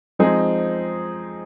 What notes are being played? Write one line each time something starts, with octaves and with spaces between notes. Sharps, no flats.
F3 G#3 C4 D#4 G#4